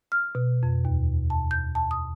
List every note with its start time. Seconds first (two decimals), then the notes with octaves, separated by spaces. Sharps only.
0.12 F6
0.35 B2
0.63 F2
0.85 D#2
1.30 A5
1.51 G6
1.75 A5
1.91 D#6